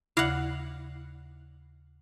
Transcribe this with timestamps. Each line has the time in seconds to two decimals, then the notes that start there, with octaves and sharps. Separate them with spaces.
0.17 D#2 C#3 E4 F5 F#5 D6 A#6